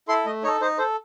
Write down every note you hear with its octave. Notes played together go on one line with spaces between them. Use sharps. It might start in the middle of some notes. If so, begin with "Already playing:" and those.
E4 A4 C6
A3 D#5
D#4 A4 C#5
D#4 C5
A4 C5